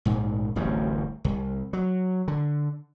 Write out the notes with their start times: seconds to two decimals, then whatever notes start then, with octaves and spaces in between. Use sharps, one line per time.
0.05 A#1 G#2
0.56 D1 A1 F#2 G3
1.24 C2
1.73 F#3
2.28 D3